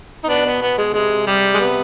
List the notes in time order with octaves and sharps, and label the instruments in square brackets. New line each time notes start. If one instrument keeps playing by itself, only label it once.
[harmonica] D#4
[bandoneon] B2 [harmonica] B3 D4
[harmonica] B3
B3
G#3
[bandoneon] D3
[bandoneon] C3 [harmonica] G#3
[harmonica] G3
G#3
[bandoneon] C3 [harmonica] B3